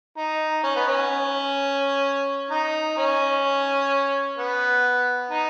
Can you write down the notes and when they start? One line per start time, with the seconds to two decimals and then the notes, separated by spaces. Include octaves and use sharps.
0.17 D#4
0.63 C#4
0.76 B3
0.87 C#4
2.50 D#4
2.97 C#4
4.37 B3
5.31 D#4